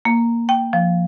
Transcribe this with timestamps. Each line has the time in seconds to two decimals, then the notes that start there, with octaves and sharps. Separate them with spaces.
0.05 A#3
0.49 G5
0.73 F3